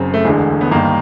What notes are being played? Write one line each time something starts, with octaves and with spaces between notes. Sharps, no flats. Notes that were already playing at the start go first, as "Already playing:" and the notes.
Already playing: F#1 F#2 C#3 C4
A3
E1 D2 D3 G#3
B3
G1 G2 D#3 A#3